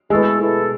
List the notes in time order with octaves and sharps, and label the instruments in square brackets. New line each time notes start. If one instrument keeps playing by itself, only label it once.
[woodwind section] B2 A3 E4 A4 [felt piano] G#3
[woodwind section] B2 A3 E4 A4